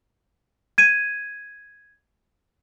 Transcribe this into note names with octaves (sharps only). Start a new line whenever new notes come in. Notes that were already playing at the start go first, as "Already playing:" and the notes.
G#6 D#7